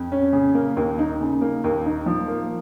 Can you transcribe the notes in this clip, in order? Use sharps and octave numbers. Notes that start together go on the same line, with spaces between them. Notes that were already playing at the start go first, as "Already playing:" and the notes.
Already playing: F2
C#4
C#3
A#3
D#2
D#4
C#3
A#3
D#2
D#4
F3
A#3